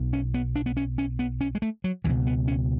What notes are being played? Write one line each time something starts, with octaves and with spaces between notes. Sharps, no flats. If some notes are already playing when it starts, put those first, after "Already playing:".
Already playing: B1 B2
C#4
B3
D4
B3
C#4
C#4
B3
C#4
G#3
A3
F#3
C#2 B2 E3
B3
C#4